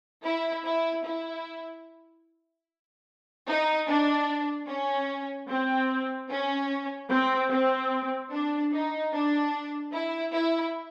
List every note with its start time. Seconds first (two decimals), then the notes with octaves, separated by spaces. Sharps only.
0.23 E4
0.64 E4
1.04 E4
3.47 D#4
3.87 D4
4.67 C#4
5.49 C4
6.29 C#4
7.10 C4
7.50 C4
8.31 D4
8.72 D#4
9.12 D4
9.92 E4
10.33 E4